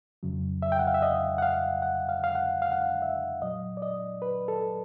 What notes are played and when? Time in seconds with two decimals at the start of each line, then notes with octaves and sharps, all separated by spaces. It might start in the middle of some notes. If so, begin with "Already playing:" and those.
0.23 F2 C#3 F#3
0.62 E5
0.72 G5
0.79 F#5
0.87 F5
0.94 E5
1.02 D#5
1.38 F#5
1.42 F5
1.82 F#5
2.09 F5
2.24 F5
2.35 F#5
2.62 F5
2.72 F#5
2.82 F5
3.02 E5
3.42 A#2 F#3 D#5
3.77 D5
3.82 D#5
4.22 B4
4.48 A4